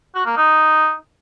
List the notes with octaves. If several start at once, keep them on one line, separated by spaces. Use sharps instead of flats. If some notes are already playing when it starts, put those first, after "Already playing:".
F#4
A#3
D#4